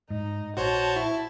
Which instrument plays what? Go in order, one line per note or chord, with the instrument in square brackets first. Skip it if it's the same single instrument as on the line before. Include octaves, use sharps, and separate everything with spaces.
[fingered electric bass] G#2 [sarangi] D#4
[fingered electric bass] A#1 [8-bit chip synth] F#4 C5 C#5 [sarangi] A5
[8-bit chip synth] E4